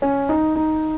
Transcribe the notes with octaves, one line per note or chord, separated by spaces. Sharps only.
C#4
D#4
D#4